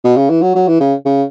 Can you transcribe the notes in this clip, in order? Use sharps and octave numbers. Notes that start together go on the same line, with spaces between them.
B2
C#3
E3
F#3
F#3
E3
C#3
C#3